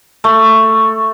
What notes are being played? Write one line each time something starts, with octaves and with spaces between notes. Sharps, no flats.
A3